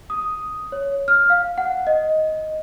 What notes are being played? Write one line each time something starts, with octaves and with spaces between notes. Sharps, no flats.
D#6
C#5
F6
F5
F#5
D#5